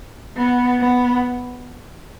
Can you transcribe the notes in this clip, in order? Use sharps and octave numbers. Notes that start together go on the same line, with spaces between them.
B3
B3